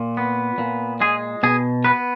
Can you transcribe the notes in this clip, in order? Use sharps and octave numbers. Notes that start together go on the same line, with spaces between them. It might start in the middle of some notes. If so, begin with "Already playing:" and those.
Already playing: A#2
B3
A#2
G#3 G#4
B2 G#4
B3 B4